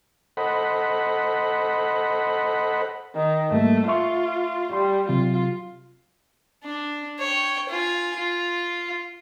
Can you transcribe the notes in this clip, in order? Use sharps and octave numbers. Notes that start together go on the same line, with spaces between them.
A4 C5 D#5 F#5 B5
D#3
G#2 G3 A3 A#3
F4 E5 C6 C#6
G3 C6
C3 F#3 F4
D4
C#5 G5
F4 G#5
F4